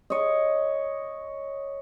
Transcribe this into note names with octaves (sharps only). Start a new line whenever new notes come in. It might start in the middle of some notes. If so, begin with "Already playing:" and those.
C#5 D#5